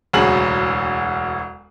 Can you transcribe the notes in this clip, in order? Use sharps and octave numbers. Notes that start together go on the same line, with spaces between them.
E1 D2 C#3 F#3 G#4 F#7